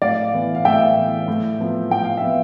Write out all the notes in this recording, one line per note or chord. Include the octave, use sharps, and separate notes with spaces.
A2 D5 F5
E3 B3
F5
A2 E5 G5
E3 B3
A2
F3 B3
A2 G5
F5
F3 B3 E5